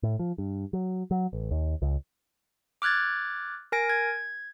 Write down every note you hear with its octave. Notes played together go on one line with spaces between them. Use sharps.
A2
F3
G2
F#3
F#3
A1
D#2
C#2
D6 F6 F#6 G#6 A6
A#4 G#5 A#6 D7
G#6